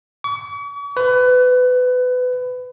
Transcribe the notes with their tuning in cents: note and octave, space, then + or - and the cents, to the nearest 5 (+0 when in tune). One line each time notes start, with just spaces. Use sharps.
C#6 +45
B4 +25